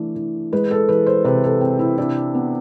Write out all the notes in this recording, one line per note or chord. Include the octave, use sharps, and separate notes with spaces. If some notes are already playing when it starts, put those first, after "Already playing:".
Already playing: E3 A3 D4
E3
G#3 B4
A4
E3 B4
C5
C3 B4
A4
C4
E4
D4 E4
B3